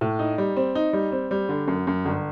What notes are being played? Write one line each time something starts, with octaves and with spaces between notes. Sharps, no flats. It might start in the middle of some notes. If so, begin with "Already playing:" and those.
A2
D#4
G3
C4
D#4
G3
C4
G3
D3
F#2
F#2
G1